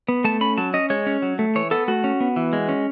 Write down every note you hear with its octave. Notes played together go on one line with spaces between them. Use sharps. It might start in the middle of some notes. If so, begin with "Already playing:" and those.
B3
A3 A5
C#4 B5
F#3 A5
C#4 D#5
G#3 C#5
C#4
F#3
A3
E3 C#5
B3 A4
A3 F#4
C#4
B3
E3
G#3
C#4